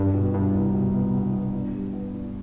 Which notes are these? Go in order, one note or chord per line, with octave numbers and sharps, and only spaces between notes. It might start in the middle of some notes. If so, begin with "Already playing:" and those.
Already playing: G2 G3
B2
G2 B2
C2
B2
B3
B2
B3
D4
G3
B3
D4